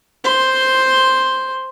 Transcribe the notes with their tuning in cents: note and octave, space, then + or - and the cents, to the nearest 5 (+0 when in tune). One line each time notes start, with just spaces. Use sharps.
C5 +0 C6 +0